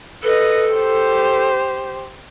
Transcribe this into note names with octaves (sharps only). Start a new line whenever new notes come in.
A4 B4 D#5
G4 C5